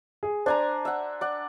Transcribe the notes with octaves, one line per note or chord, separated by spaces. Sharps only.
G#4
D4 C5 G#5 A#5
E5 F#5
D5 F#5